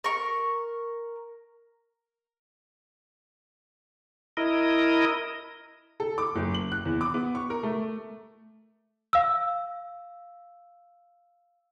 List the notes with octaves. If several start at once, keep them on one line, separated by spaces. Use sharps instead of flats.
A#4 C#6
E4 A#4 D#5
A4
D6
F#1
F#7
F#6
E2
D6
B3
C#6
A#4
A3
F5 E6